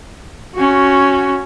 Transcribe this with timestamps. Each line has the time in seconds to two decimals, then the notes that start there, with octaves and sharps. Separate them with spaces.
0.54 C#4 F#4